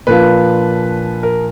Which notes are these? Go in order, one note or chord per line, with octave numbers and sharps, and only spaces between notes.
A#2 F3 A#3 D4 F4 B4
A#4